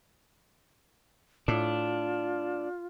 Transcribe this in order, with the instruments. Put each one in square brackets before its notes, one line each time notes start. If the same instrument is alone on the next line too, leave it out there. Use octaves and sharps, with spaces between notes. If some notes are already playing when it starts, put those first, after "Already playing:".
[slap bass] A2 [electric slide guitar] D4 [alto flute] F4